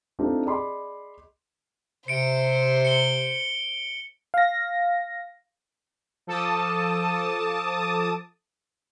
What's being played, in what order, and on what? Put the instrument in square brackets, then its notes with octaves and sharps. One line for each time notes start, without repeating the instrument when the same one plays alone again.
[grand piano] A3 C4 D4 D#4 F4 G4
G#4 D5 D#5 B5 C6 D6
[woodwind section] C3 [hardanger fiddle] C5 [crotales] C#7 D7
[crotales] C#7 G7
[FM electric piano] F5 A#6
[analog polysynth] F3 A4 A5 D6 D#6